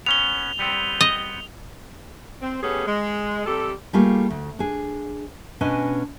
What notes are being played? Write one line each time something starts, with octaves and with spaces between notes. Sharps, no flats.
B3 C#4 F7 G7
G3 B3 C4
D#5
C4
A3 B3 C#4 G4 G#4
G#3
C3 G3 G4 A4
G3 A3 A#3 F4 G#4
D2
D4 G#4
B2 C#4 D4 B4 D#5 G#5